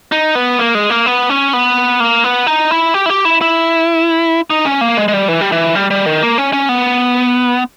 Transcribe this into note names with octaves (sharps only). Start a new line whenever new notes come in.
D#4
B3
A#3
G#3
A#3
B3
C#4
B3
A#3
B3
D#4
E4
G4
E4
G4
E4
E4
D#4
C#4
A#3
G#3
G#3
G3
E3
G3
E3
G3
G3
D#3
A#3
C#4
C#4
B3